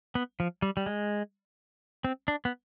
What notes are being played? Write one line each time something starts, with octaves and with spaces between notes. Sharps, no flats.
B3
F3
G3
G3
G#3
C4
D4
B3